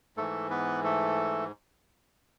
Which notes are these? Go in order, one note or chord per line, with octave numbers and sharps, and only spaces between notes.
G#2 E3 A3 A4
B3 B4
A3 A4